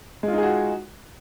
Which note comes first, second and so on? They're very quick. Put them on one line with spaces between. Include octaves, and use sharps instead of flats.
G#3 F4 D#4 G#4 F#4